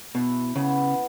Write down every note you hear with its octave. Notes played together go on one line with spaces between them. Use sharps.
B2 E4
C#3 B3